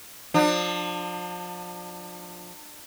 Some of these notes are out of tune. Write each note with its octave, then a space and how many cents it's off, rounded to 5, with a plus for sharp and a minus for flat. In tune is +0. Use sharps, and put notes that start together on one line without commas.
F3 +30 D4 +35